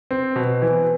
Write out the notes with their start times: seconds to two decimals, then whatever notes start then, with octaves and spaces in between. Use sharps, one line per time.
0.11 C4
0.36 B2
0.62 E3